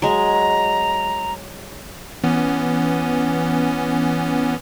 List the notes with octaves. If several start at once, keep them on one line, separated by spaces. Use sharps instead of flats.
F#3 G#3 A#5
E3 B3 C#4